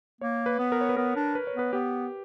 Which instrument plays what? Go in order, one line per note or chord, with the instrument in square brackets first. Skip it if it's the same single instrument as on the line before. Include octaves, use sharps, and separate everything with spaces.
[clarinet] A#3 [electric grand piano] C#5
[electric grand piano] B4
[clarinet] B3
[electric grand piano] A#4
C#5
B4
[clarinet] B3 [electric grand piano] A#4
[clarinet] D4
[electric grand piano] B4
C#5
[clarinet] B3 [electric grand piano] B4
[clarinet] B3 [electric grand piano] G4